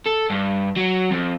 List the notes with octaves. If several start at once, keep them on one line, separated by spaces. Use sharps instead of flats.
A4
G2
F#3
F2